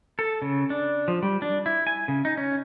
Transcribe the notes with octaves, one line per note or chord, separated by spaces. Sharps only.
A4
C#3
D4
F3
G3
D4
E4
G#5
C#3
D#4
C#4